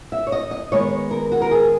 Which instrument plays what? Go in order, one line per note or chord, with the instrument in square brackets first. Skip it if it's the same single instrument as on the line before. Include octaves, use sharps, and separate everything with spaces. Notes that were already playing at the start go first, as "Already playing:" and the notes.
[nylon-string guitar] E5
C#5
D#5
D#5
D#3 G#3 B3 C#5
A#4
F#4
A#4
G#4